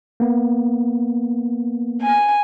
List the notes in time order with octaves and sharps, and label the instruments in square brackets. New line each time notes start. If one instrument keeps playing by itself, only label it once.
[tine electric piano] A#3 B3
[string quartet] G#5